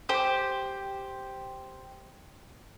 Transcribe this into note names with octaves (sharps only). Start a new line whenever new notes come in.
G4 C5